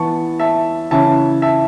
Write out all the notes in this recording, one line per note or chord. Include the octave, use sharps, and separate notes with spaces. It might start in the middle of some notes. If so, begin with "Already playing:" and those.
Already playing: E3 B3 A5 C#6
E5 A5
C#3 E3 C#4 E5 A5
E5 A5